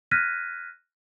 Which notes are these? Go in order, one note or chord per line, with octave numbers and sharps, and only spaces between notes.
F6 F#6 G#6 A#6 B6 D#7